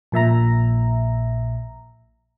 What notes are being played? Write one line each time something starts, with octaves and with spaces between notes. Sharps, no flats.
A#1 A#2 E5 A#5